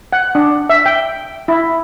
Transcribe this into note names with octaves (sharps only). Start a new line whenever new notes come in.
F#5
D4
E5
G5
E4